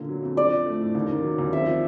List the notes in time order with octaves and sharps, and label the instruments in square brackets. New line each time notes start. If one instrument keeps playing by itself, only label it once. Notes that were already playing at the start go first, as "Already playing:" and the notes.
Already playing: [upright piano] A#2 D3 A#3
F#3
F2
[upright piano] D4 [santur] D5
[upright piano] F3
A3
A2
D#2
D#3
F#3
D#2
[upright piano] C4 [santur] E5
[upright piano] F3